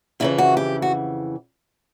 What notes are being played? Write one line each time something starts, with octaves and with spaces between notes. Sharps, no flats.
F2 C#3 E3 E4
F#4
G4
F#4